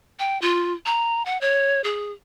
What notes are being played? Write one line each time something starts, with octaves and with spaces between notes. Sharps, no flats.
G5
F4
A#5
F#5
C#5
G#4